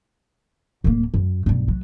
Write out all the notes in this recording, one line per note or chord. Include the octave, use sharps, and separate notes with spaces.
D1 A#3
F#2
B1 G2
F#3